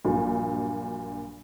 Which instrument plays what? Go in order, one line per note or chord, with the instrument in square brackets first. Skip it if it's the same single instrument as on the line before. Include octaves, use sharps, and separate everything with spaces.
[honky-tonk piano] A#1 G2 A#2 F#3